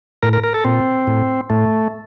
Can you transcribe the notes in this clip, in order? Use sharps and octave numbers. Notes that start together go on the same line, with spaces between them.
A2 A#4
A#4
A#4
A4
A#2 C4
A2
A2 A3